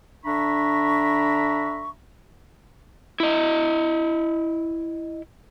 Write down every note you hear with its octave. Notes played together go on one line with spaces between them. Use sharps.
D3 D4 E5 A#5 B5 C#6
E4 D#5